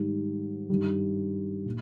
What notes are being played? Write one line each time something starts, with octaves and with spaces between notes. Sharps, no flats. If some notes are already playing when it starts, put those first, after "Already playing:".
Already playing: G#2 D#3 G3
G2 D#3 G3
A#2